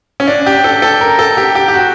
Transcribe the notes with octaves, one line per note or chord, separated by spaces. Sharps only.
C#4
D4
G4
A4
A4
A#4
A4
G4
G4
G4
F#4